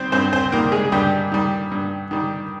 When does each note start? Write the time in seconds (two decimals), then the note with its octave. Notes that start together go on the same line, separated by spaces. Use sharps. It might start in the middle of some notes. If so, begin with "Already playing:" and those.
Already playing: D#3 G3 C4 C5
0.12 G2 C4 C5
0.33 C4 C5
0.52 D#3 G3 A#3 A#4
0.72 G#3 G#4
0.92 G2 G3 G4
1.32 D#3 G3
1.71 G2
2.11 D#3 G3